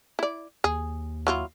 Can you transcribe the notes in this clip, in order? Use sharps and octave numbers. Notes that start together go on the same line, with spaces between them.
E4 D5
D#2 G#4
F#3 E4 F4